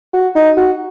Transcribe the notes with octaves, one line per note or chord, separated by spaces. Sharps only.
F#4
D#4
F#4